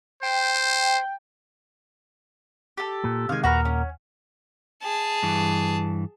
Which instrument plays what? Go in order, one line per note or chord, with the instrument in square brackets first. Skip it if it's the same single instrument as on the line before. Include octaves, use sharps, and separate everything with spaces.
[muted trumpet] C5 [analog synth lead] G5
[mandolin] G4 A4
[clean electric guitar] A#2
[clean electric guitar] C3 D#3 G#3 [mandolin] F5 G#5
[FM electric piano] D#2 F#5 [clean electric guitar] A#2 A#4 [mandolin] F#4 B4 A#5
[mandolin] C#4
[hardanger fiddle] G#4 A5
[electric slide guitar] G2 E3